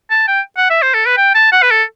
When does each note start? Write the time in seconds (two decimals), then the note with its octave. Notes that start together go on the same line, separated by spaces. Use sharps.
0.10 A5
0.28 G5
0.57 F#5
0.70 E5
0.82 C5
0.94 A4
1.06 B4
1.17 G5
1.35 A5
1.52 F#5
1.62 B4
1.71 A4